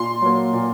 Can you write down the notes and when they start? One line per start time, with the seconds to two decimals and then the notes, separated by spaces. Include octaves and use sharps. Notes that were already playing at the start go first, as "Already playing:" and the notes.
Already playing: A#2 C6
0.21 F#3 A#3
0.53 A#2